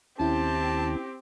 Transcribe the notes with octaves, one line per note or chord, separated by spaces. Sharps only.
D#2 C4 C#4 E4 G4 A5